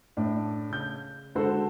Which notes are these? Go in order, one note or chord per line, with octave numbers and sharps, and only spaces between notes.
A2 D4
C#3 G6
D3 G#3 F#4 A4 C5